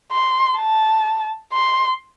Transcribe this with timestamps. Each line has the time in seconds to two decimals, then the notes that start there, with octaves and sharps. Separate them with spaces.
0.12 C6
0.58 A5
1.53 C6